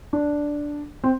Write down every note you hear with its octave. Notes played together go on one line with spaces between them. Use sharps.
D4
C4